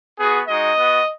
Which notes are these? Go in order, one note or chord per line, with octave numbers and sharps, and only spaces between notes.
B3 F#4 G#4
G#3 D#4 F#4 D#5
B3 F#4